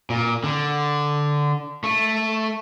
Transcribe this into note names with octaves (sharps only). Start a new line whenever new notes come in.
A#2
D3
A3